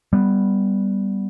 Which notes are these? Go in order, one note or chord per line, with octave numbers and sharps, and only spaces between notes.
G3 B3